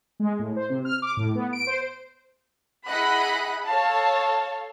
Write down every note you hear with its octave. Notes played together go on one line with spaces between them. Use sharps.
G#3
A2
C5
C3
F6
D6
A2
B3
D7
C5
E4 G#4 D#5 F#5 B5 F#6
A4 C#5 F5 A5